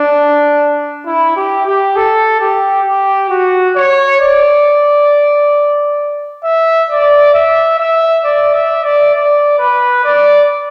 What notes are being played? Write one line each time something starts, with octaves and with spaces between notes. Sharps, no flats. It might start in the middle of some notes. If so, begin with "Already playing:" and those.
Already playing: D4
E4
G4
G4
A4
G4
G4
F#4
C#5
D5
E5
D5
E5
E5
D5
E5
D5
D5
B4
D5